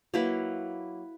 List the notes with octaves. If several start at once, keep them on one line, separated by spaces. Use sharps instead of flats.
F#3 A#3 E4 B4